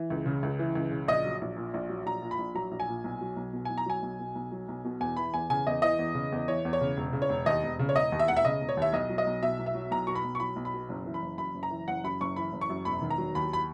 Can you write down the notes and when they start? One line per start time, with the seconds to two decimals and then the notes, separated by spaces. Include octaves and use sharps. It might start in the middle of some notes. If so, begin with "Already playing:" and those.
Already playing: E3
0.10 C#2
0.26 C#3
0.43 C#2
0.59 E3
0.75 C#2
0.91 C#3
1.08 A#1 D#5
1.25 F#3
1.41 A#1
1.57 A#2
1.74 A#1
1.89 F#3
2.06 A#1 A#5
2.22 A#2
2.31 B5
2.38 A#1
2.55 F#3 A#5
2.71 A#1
2.80 G#5
2.89 A#2
3.04 B1
3.21 F#3
3.37 B1
3.53 B2
3.65 B1 G#5
3.78 A#5
3.86 F#3 G#5
4.02 B1
4.19 B2
4.35 B1
4.52 F#3
4.68 B1
4.84 B2
5.00 E2 G#5
5.17 E3 B5
5.34 E2 G#5
5.50 C#3 G#5
5.67 E2 D#5
5.82 E3 D#5
5.99 E2
6.15 C#3
6.32 E2
6.47 E3 C#5
6.65 E2
6.73 C#5
6.81 C#3
6.97 E1
7.13 C#3
7.22 C#5
7.29 E1
7.46 D#2 D#5
7.63 E1
7.79 C#3
7.89 C#5
7.94 E1 D#5
8.12 D#2
8.19 E5
8.28 E1 F#5
8.37 E5
8.45 C#3 D#5
8.61 E1
8.69 C#5
8.77 D#2 E5
8.93 B1 D#5
9.09 F#3
9.18 D#5
9.27 B1
9.42 B2 E5
9.59 B1
9.66 E5
9.74 F#3
9.91 B1 A#5
10.07 B2 C#6
10.15 B5
10.24 B1
10.35 C#6
10.40 F#3 B5
10.56 B1
10.65 B5
10.74 B2
10.89 F#1
11.06 E3
11.14 B5
11.22 F#1
11.38 F#2 B5
11.54 F#1
11.63 A#5
11.71 E3
11.88 F#1 F#5
12.04 F#2 B5
12.21 F#1 C#6
12.36 E3 B5
12.53 F#1
12.61 C#6
12.69 F#2
12.85 E1 B5
13.02 D#3
13.10 A#5
13.18 F#3
13.35 D#2 B5
13.53 B5